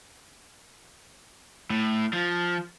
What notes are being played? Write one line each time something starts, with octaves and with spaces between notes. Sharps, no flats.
A2
F3